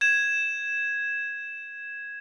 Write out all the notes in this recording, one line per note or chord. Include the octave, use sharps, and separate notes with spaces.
G#6 E7